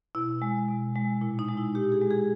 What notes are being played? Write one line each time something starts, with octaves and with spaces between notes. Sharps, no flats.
B2 E4
G#3
B2
G#3
A#2 E4
D#4
G#3
E4
A#2 G4
G#4
G#3
G#4